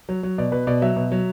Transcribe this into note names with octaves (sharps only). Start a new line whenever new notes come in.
F#3
F#3
B2 D5
B2 B4
B2 D5
F#3 E5
B2
F#3